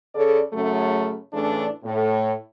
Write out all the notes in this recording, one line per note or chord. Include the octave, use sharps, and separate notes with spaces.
C#3 A4 D5
F#2 C#3 A3
A2 C#3 E3 A3 D4
A2